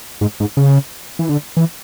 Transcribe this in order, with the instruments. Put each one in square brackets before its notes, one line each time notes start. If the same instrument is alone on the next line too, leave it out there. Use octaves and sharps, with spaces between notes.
[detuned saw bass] G#2
G#2
C#3
E3
D3
E3